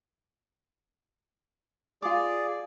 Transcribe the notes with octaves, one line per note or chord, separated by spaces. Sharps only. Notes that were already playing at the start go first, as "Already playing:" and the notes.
F4 G#4 D5 D6